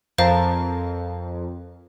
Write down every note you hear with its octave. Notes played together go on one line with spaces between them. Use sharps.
F2 A#4 C5 F5 A5 A#5